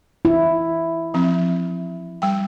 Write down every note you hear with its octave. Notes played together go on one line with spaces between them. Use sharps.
E4
F3 C4
G3 G5